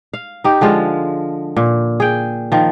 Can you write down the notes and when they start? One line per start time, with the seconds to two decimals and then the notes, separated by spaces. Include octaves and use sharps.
0.14 F5
0.44 D#4 G4
0.61 D3 F3 G#3 F4
1.57 A#2
2.00 G#4 G5
2.52 D#3 F3